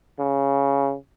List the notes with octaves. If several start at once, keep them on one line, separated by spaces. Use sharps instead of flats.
C#3